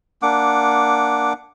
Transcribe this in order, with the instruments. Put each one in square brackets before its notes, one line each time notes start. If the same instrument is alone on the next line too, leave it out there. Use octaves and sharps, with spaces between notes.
[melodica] A#3 D4 F#5 D6